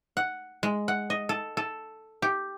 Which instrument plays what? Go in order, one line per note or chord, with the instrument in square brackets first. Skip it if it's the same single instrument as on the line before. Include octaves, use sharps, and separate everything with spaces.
[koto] F#5
G#3
F#5
D#5
A4
A4
G4